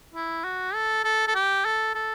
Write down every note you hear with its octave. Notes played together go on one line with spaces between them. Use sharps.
E4
F#4
A4
A4
A4
G4
A4
A4